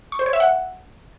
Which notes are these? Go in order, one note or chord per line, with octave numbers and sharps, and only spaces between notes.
C#6
C5
C#5
E5
F#5